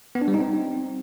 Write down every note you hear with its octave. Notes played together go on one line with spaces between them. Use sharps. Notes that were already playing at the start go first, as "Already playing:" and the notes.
B3
D4
G3
D#4
C4